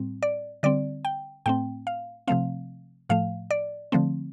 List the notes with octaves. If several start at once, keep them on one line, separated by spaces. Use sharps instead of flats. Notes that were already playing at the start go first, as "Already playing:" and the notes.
Already playing: A2 G3 C4
D5
D3 G3 C4 D5
G5
A2 A3 C4 G5
F5
C3 F3 A3 C4 F5
A2 F3 A3 F5
D5
D3 F3 A3 C4